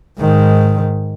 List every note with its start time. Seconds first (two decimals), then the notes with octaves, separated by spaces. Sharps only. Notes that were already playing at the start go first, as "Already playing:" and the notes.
0.18 G#2 D#3